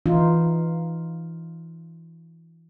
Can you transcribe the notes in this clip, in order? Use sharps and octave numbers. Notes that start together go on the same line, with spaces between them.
E3 D#4 F4